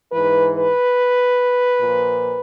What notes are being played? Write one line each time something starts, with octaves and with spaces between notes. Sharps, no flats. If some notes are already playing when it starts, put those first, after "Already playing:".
G#2 E3 B4
B4
A#2 F3